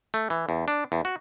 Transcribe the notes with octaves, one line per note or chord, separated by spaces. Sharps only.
A3
E3
E2
D4
E2
F#4